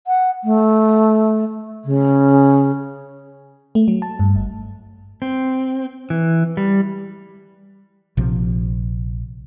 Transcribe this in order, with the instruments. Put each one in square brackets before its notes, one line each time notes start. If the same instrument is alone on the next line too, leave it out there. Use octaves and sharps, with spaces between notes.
[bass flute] F#5
A3
C#3
[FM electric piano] A3
F#3
A5
G2
G1
[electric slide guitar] C4
E3
G3
[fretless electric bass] A#1 C3 F3